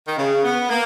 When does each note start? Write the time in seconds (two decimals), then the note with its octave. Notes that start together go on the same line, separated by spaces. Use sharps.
0.08 D#3
0.18 C#3
0.44 B3
0.69 A#3